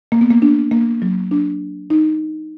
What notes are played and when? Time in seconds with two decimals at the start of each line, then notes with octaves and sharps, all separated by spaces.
0.12 A#3
0.21 B3
0.31 A#3
0.42 D4
0.71 A#3
1.02 F#3
1.31 D4
1.90 D#4